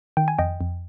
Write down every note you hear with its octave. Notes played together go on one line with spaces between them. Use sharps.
D#3 G5
G#5
F2 D#5 G5
F2